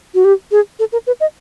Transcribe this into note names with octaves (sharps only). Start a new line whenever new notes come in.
F#4
G4
G#4
A4
A#4
B4
D#5